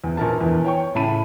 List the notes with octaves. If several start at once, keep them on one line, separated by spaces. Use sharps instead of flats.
E2
A#1 A#4 A5
E2 E3
C#5 G5 C#6
A2 C#3 A5 B5 D#7